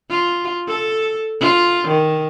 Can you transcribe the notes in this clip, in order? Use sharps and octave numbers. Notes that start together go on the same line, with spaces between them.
F4
A4
F4
D#3